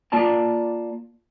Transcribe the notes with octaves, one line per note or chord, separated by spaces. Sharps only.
A#3 F4 D5 A5 A#5